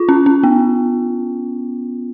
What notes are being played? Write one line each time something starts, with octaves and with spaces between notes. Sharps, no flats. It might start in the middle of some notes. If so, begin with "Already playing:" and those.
Already playing: F4
C#4
C#4
B3